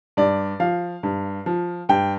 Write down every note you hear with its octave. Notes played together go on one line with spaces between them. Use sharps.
G2 D5
F3 F5
G2
F3
G2 G5